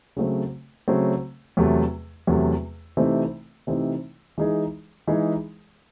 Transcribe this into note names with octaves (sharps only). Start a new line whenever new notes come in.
C#3 F#3 A3 C4
C#3 F#3 A3 C4
E2 C3 F#3 A3
E2 C3 F#3 A3
C3 E3 A3 C4 D#4
C3 E3 A3 C4 D#4
E3 G#3 D#4 G#4
E3 G#3 D#4 G#4